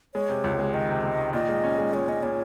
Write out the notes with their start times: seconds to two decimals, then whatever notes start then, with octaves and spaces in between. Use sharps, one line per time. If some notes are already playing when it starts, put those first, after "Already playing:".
0.14 G#3 C#5
0.29 C3
0.44 C#2
0.59 G#3
0.74 D#3 D#5
0.89 C3
1.04 G#3
1.18 D#3
1.33 A#2 D#5
1.49 G#3
1.64 C#4
1.78 G#3
1.93 G#3 C#5
2.08 C#4 D#5
2.23 A#2 C#5